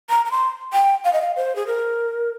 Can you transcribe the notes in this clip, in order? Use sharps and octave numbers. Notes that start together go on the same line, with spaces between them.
A#5
A#5
C6
G5
F5
D#5
F5
C5
G#4
A#4